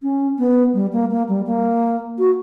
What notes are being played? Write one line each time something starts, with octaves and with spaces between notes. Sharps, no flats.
C#4
B3
G3
A#3
A#3
G3
A#3
F#4